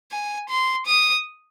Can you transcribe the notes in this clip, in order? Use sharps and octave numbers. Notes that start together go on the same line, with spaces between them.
G#5
C6
D#6